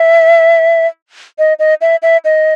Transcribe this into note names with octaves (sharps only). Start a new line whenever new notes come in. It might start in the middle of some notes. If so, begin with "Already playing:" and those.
Already playing: E5
D#5
D#5
E5
E5
D#5